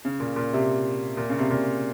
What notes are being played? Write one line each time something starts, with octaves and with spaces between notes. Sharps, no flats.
C#3
A#2
A#2
C3
A#2
C#3
C3
A#2